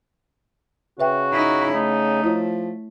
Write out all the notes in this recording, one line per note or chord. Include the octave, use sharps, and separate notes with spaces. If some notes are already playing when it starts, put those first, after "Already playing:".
C#3 F#4 B4 E5 G5
D#4 E4
A3 D#4
F3 E4 C#5